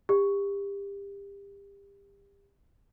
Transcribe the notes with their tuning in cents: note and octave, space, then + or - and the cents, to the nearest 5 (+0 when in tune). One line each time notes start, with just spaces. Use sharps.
G4 +30